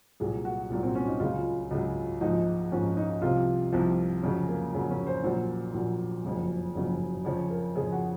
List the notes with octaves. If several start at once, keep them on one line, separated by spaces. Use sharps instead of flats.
C2 A#2 F#3 G#4
F#4
C2 A#2 F#3
C4
C#4
D#4
C#2 C#3 F#3 F4
C#2 C#3 F#3
A#1 G#2 F3 D#4
A#1 G#2 F3 C#4
D#4
C2 C3 F3 F4
C2 C3 F3
F2 C#3 F#3 C#4
A#3
F2 C#3 F#3
C#4
C5
A#1 A#2 F#3 C5
A#1 A#2 F#3
F#1 F2 C#3 F#3
F#1 F2 C#3 F#3
F2 C#3 F3 C#5
A#4
F2 C#3 F3 G#4
F#4